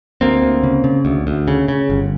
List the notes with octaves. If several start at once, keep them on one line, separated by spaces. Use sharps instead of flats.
D2 A#3 C4
D2
C#3
C#3
D2
D2
C#3
C#3
G1